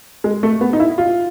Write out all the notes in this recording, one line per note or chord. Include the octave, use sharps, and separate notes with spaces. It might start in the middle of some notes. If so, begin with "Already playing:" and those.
G#3
A3
B3
D#4
E4
F4